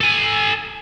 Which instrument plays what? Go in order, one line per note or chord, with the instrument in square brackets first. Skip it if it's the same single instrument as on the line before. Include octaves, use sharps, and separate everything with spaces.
[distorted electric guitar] A4 G#5